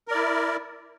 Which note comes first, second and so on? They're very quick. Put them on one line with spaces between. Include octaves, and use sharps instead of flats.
A#4 D5 E4